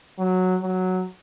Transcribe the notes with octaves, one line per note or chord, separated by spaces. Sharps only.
F#3
F#3